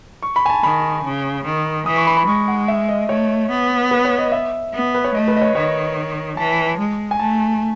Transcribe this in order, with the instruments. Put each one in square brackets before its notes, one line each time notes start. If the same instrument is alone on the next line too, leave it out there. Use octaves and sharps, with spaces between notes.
[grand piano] C#6
B5
G#5
A5
[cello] D#3 [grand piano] B5
[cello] C#3
D#3
[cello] E3 [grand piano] D#6
[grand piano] C#6
B5
B5
[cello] G#3 [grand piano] C#6
[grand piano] F#5
E5
D#5
[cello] A3 [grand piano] C#5
[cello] B3
[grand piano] B4
C#5
D#5
E5
[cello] B3
[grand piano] B4
C#5
[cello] A3 [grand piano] D#5
[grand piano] B4
D#5
C#5
[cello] D#3 [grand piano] C#5
[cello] E3 [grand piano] A5
[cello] G#3
[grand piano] G#5
[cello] A3 [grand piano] A5